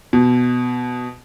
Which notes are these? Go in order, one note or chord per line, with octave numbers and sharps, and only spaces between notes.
B2